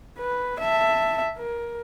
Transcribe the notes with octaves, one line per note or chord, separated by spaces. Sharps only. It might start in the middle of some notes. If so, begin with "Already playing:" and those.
B4
E5 A5
A#4